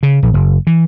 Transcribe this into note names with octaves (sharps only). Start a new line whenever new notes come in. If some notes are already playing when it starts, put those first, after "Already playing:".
C#3
A#1
F#1
E3